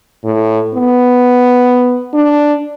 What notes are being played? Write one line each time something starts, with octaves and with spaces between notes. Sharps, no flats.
A2
B3
D4